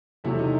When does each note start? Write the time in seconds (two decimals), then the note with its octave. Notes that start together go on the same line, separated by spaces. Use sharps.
0.24 E2 C3 F#3 A3 E4
0.39 D#4